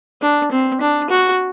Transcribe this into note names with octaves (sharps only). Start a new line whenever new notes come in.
D4
C4
D4
F#4